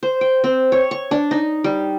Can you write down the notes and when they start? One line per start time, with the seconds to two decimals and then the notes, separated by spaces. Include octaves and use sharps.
0.03 C5
0.21 G5
0.44 C4
0.72 C#5
0.91 C#6
1.11 D4
1.31 D#4
1.64 G3